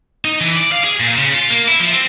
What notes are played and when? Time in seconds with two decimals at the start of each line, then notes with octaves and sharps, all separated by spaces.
0.25 D#4
0.41 E3
0.56 D5
0.72 F5
0.84 G#4
1.00 A#2
1.18 C#3
1.34 F4
1.50 A#3
1.68 E4
1.80 F3
1.93 C4